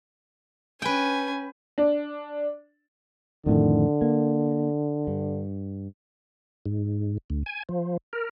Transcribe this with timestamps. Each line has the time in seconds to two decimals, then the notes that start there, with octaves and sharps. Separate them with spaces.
0.82 C#4 B4 G5 G#5
1.78 D4
3.46 F2 A2 D3 D#3
4.01 A#3
5.07 G2
6.66 G#2
7.30 D2
7.46 G#5
7.69 F3
8.13 A#4